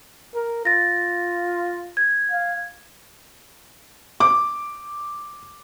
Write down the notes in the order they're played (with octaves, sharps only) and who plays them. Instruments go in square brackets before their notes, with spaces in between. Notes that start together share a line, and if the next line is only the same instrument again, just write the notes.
[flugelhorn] A#4
[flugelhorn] F4 [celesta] A6 A#6
[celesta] G#6
[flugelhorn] F5
[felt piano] D6